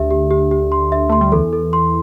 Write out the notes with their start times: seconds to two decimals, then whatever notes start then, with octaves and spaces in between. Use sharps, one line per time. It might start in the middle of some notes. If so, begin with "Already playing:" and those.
Already playing: D2 D3 G4 E5
0.11 G4
0.30 G4
0.51 G4
0.72 C6
0.92 E5
1.09 A3 C6
1.21 G3
1.32 E2 E3 A4
1.53 A4
1.73 C6